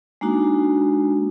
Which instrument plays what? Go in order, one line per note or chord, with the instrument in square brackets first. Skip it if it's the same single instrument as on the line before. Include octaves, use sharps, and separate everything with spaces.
[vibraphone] G#3 A#3 D4 D#4 F#4